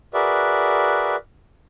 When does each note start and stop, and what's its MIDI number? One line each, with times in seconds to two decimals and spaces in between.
0.14 1.16 66
0.14 1.16 68
0.14 1.16 70
0.14 1.16 71
0.14 1.16 74
0.14 1.16 76